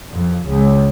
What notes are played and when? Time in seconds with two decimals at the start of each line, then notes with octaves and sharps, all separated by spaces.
0.12 F2
0.47 C#2